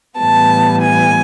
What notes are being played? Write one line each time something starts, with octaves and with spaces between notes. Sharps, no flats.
A2 E3 G3 B3 A5
G#5